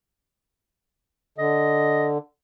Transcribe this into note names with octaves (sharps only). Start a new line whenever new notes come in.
D3 D#5